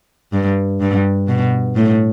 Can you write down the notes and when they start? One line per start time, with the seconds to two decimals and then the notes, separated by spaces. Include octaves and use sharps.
0.33 G2
0.81 G2
1.28 B2
1.76 A2